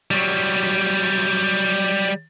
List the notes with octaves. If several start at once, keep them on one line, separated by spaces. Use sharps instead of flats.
F#3 G3